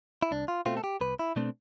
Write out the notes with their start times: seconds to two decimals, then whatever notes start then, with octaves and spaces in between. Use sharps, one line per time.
0.23 E4
0.31 C2 D4
0.48 F4
0.66 B2 A3 C4 F4
0.77 A4
0.84 G4
1.01 C2 B4
1.19 E4
1.36 B2 A3 C4 D4